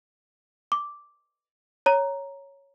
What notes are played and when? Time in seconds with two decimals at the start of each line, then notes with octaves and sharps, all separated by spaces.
0.72 D6
1.86 C#5 A#5